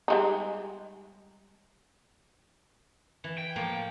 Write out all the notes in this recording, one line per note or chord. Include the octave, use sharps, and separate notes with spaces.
G3 G#3 D#4
E3
G5
A2 F3 A#3